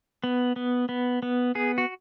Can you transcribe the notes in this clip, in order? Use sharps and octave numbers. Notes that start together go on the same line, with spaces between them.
B3
B3
B3
B3
B3 G#4
F#4